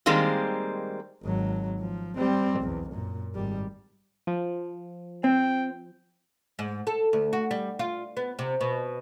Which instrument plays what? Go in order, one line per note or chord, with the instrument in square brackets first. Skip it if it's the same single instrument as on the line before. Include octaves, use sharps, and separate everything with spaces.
[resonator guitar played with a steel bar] D#3 G3 G#3 A#3 C4
[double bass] G#1 F#3
F3
G3 C4
B1 E2
F#2 A#2
G#1 G3
[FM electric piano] F3
[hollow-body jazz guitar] C4 [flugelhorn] G5
[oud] G#2
A4
D2
F#4
G3
F4
B3
C3
B2